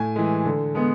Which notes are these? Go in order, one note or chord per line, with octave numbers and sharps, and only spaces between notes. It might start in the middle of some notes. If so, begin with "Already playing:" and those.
Already playing: A2 G#5
E3 G#3
D3
G#3 B3